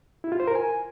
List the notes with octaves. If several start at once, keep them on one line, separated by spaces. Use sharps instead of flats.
E4
F4
C5
A#4
G#5